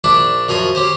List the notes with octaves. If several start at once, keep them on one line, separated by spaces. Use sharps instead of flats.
A#1 D4 E4 D5
F#2 F3 A#4 G#5
C#4 G4 C5